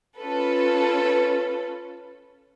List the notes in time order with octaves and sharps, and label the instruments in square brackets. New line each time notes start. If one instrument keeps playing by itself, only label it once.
[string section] C#4 F4 A4 B4